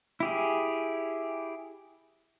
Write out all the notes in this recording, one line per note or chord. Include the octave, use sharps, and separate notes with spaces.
E4 G4 G#4